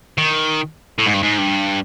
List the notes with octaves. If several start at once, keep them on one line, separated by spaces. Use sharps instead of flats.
D#3
A2
G#2
G2
G#2
G2